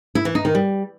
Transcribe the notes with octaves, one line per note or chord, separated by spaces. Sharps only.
E4
E3
D#4
D#3
G3